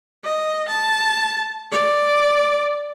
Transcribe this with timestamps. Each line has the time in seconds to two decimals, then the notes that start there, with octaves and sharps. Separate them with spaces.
0.24 D#5
0.68 A5
1.71 D5